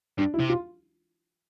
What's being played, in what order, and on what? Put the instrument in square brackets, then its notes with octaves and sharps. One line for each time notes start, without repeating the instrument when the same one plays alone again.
[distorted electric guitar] G2 [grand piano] D4
[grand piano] E4
[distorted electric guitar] C3
[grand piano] F4